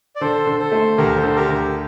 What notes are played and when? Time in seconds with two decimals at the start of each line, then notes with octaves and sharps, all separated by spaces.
0.16 D5
0.21 D3 A4 C5
0.47 D3
0.59 A4 C5
0.72 A3
0.97 D2 G4 A#4
1.16 A4 C5
1.24 D3
1.36 G4 A#4
1.49 D2
1.55 G4